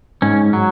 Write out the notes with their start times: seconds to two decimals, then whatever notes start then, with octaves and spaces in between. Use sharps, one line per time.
0.22 G#2 C#4
0.53 F#3